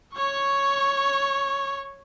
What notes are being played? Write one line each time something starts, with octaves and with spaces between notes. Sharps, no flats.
C#5 C#6